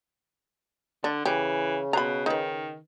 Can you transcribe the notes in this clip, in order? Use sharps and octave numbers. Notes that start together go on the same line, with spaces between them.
D3 D4
C#3 E3 G4
B2 A#5 B5
D#3 D#4 B4